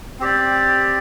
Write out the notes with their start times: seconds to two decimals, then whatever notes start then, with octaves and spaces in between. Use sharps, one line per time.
0.19 C4 G4 D5